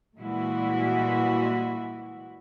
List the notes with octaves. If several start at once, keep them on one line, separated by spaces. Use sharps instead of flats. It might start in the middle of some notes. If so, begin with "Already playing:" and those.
A#2 E3 G3 G#3 E4 F#4